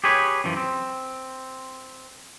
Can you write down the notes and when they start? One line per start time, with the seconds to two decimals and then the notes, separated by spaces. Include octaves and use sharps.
0.04 G4 G#4 B4 C#5
0.44 F#2 E3 F3
0.57 C4